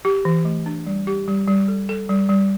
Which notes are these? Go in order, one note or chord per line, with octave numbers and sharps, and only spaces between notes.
G4
E3
A3
D4
G3
G4
G3
G3
A4
A4
G3
G3